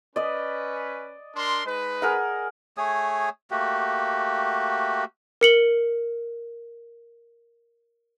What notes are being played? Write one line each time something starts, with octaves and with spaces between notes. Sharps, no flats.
C#4 B4 D5 D#5
D4 A#4 C6
G#3 D#4 B4
G#4 A#4 F#5
A3 G#4 C#5 D#6
A3 A#3 F#4 G4
A#4 C#7 F#7 G7